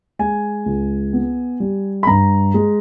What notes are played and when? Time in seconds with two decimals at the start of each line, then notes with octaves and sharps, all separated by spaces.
0.19 G#3 G#5
0.66 C#2
1.13 B3
1.60 G3
2.03 B5
2.07 G2 A#5
2.54 G#3